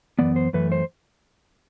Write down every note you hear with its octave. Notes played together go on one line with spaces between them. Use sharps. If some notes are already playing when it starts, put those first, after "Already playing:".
F#2 E3 B3 D5
C5
F#2 E3 A3 B4
C5